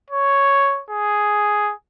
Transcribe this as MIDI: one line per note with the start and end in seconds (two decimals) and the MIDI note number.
0.10 0.81 73
0.90 1.73 68